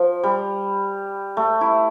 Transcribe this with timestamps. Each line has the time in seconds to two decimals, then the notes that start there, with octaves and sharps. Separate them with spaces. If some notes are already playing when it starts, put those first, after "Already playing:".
Already playing: F3
0.23 G3
1.37 A3
1.61 E4